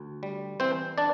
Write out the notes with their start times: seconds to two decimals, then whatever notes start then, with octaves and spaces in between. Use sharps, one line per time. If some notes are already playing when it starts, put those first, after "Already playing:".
Already playing: D2
0.23 G3
0.60 E3 C4 C5
0.98 D4 D5